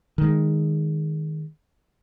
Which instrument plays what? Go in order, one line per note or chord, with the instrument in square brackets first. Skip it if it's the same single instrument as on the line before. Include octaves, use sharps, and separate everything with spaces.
[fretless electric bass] D#3 G#3